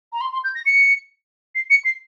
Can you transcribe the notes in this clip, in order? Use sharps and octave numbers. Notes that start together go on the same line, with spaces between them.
A#5
C6
C6
G6
A#6
C#7
C7
C#7
C7